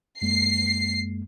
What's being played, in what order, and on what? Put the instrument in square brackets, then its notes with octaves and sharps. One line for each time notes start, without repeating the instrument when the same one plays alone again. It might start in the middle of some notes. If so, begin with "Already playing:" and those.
[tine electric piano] F#2 G#3 A#3 [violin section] C7